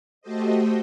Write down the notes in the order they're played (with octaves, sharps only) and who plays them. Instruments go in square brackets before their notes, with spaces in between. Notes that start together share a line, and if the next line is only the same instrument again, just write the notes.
[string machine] A3 F#4 G4 A4 C5 D#5